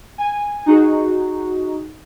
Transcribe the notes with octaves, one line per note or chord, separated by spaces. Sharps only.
G#5
D#4 F#4 G#4